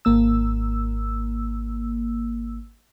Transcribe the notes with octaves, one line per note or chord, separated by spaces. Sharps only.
G#1 A#3 E6